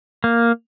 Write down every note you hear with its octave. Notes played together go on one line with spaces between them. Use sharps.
A#3